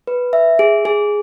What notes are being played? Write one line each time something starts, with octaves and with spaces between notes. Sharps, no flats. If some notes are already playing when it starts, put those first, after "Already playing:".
B4
E5
G#4
G#4